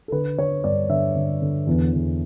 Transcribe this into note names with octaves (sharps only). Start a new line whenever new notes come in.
A4
D3 B4
D3 C#5
G2 D5
D3 E5
D3
D3
E2
E2